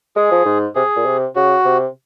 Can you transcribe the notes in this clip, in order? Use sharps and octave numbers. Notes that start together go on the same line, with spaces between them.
G#3 G#4
F3
G#2
C3 G#4
A#2
C3
C#3 F#4
C3